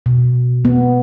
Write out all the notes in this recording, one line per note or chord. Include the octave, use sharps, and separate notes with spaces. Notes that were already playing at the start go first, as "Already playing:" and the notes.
B2
B3